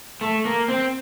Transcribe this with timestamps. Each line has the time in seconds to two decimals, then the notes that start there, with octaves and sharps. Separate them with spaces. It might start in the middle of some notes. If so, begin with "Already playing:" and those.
0.21 A3
0.45 A#3
0.68 C4